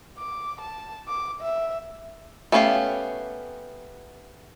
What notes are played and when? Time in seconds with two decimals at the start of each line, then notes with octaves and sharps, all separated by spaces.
0.18 D6
0.61 A5
1.08 D6
1.41 E5
2.52 A3 B3 C#4 G4 F5